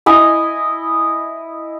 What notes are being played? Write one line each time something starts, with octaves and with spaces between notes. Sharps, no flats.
E4 D#5 G#5